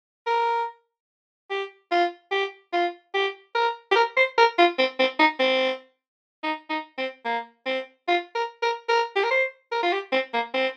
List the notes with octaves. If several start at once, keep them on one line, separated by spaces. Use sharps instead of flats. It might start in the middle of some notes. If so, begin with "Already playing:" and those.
A#4
G4
F4
G4
F4
G4
A#4
G4
A#4
C5
A#4
F4
C4
C4
D#4
C4
D#4
D#4
C4
A#3
C4
F4
A#4
A#4
A#4
G4
A#4
C5
A#4
F4
G4
C4
A#3
C4